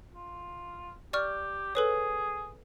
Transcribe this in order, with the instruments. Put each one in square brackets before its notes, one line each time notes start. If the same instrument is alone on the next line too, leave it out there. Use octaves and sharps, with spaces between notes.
[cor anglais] F4
[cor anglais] G4 [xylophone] D5 C#6 F6
[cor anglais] G#4 [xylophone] A4 B4 C#5